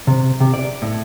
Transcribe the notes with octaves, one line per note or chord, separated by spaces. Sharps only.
C3
C3
D5
A2